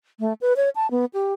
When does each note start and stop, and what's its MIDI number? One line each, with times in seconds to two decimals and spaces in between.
0.20 0.33 57
0.41 0.53 71
0.57 0.69 73
0.76 0.90 81
0.91 1.05 59
1.14 1.34 67